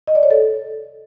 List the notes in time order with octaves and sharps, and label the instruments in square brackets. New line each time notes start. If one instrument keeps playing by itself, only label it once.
[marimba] D#5
D5
C#5
A4